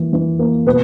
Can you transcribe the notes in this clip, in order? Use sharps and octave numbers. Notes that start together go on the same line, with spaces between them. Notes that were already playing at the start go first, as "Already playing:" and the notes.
Already playing: E3 A#3 E4
E3
A#3
B2 B4